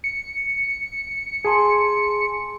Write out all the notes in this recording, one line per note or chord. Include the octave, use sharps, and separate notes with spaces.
C#7
G#4 G#5 A5 C6